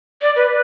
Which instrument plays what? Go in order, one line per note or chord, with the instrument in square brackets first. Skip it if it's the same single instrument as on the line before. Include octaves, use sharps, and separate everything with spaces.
[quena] D5
B4